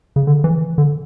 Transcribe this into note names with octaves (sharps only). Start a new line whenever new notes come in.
C#3
D3
E3
D3